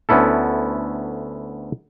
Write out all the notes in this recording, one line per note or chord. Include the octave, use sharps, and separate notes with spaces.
D2 B3 C#4 E4 A4